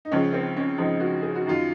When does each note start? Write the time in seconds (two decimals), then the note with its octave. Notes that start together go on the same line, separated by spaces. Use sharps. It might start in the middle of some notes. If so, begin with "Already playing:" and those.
0.05 D#4
0.11 C#2 C#3 F3 C#4
0.33 C4
0.56 C#4
0.78 C#2 C#3 F3 D#4
1.00 F#4
1.22 G#4
1.35 F#4
1.46 F#2 D#3 F4